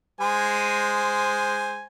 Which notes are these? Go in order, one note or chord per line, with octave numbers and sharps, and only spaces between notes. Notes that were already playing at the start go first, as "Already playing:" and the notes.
G#3 C5 G#5